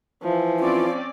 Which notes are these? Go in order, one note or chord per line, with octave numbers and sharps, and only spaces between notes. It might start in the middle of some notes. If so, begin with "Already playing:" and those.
E3 F3 E4
C4 C#4 F4 D5